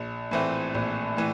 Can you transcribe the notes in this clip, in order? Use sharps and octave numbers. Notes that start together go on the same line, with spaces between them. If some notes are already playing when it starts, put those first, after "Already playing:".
Already playing: A#1
A2 E3 A3 C4
A#1
A2 E3